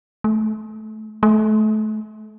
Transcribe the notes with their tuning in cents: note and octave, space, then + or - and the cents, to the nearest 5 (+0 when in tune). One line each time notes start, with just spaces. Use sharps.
A3 -20
A3 -30